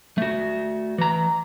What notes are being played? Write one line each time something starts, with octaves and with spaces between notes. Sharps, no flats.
A3 F#4
E3 A#5